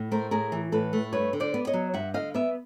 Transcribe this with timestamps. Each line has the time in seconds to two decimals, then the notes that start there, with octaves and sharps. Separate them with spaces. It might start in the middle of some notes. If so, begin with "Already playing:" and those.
Already playing: A2
0.12 A3 A#4 C5
0.31 A2 G#4 A#4
0.52 E3
0.72 A2 A4 B4
0.93 A3
1.13 G2 B4 C#5
1.33 D3
1.40 C5 D5
1.54 B3
1.67 C#5 D#5
1.73 F#3
1.94 G2 E5 F#5
2.14 D3 D#5 F5
2.34 B3 D5 E5